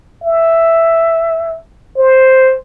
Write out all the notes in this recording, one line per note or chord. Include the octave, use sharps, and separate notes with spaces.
E5
C5